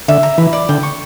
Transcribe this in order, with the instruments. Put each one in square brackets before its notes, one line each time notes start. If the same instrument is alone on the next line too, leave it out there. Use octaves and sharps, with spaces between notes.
[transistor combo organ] D3 [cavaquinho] E5
[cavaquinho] A#5
[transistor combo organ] E3 [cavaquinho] B5
[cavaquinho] D5
[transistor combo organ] D3 [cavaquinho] G5
[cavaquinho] C#6